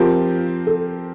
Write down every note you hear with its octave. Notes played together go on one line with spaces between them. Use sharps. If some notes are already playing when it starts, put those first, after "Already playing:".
Already playing: F3 C4 F4 G4 A#4
A4